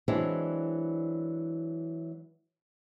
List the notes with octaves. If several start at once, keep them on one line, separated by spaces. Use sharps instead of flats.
E3 F#3 G#3 C4 D4 E4